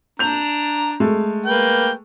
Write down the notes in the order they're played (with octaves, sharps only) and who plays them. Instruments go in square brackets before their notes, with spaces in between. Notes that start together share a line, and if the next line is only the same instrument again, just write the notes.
[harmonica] D4 A#5 [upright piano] G6 F7
[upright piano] G#3 A3
[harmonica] A#3 B4 G5